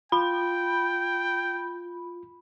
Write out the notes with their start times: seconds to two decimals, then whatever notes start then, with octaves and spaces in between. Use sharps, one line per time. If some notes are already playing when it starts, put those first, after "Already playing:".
0.12 F4 G5 B5